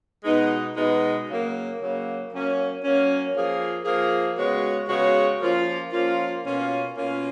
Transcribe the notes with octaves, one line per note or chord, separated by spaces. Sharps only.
B2 G#3 B3 D#4
B2 G#3 B3 D#4
C#3 F#3 A#3
C#3 F#3 A#3
F#3 A#3 C#4
F#3 A#3 C#4
F3 A#3 F4 G#4
F3 A#3 F4 G#4
C#3 G#3 B3 F#4 C#5
C#3 G#3 B3 F#4 C#5
F3 A#3 C#4 F4
F3 A#3 C#4 F4
B2 A#3 C#4 F4
B2 A#3 C#4 F4